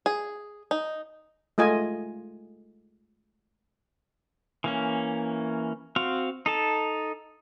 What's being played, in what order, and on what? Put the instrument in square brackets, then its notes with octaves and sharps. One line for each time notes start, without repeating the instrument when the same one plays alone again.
[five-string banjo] G#4
D#4
[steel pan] G#3 A3 F4 D#5 G#5
[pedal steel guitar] E3 A#3 C#4
C4 F#4 F5
D#4 A4 A5